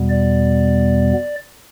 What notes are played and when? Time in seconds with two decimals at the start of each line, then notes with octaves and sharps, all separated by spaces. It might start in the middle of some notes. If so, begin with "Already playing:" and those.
Already playing: E2 B2 G3 B3
0.10 D5